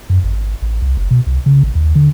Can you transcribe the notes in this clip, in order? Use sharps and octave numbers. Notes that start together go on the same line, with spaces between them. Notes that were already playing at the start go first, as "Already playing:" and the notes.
F#2
G#1
A1
C2
F#1
B2
C2
C#3
A1
D#2
D3